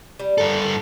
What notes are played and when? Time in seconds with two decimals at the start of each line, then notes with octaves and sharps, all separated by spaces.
0.19 G3
0.38 G2 A4 A#4